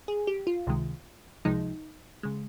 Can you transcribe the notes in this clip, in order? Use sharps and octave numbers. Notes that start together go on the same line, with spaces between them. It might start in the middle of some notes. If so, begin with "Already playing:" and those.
G#4
G4
F4
C#2 C3 D#3 G#3
C#2 C3 F3 G#3 D#4
C#3 G#3